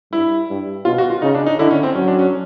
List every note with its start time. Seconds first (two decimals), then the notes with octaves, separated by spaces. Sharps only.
0.12 G2 E4
0.49 G2
0.85 B2 F4
0.98 F#4
1.10 F4
1.22 C#3 D#4
1.34 D4
1.46 D#4
1.58 D3 E4
1.71 C#4
1.83 C4
1.95 F#3 C#4
2.08 D4
2.19 C#4